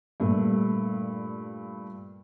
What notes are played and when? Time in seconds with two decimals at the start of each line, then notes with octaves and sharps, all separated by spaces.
0.20 G2 A#2 A3